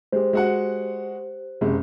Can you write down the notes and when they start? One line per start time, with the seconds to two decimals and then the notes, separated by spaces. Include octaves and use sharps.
0.12 G#3 G4 C5
0.33 G#3 F#4 F#5
1.61 F#1 C3 G#3